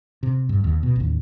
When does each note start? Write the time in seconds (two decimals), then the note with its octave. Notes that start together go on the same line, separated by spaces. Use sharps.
0.23 C3
0.49 G2
0.64 D#2
0.83 B2
0.96 A1 D#2